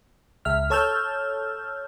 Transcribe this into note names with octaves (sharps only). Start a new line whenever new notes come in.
C#2 E5 F6
A4 C#5 A5 E6 F6 G6